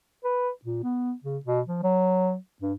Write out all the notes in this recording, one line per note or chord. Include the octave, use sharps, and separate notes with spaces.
B4
A#2
B3
C#3
B2
F3
F#3
G2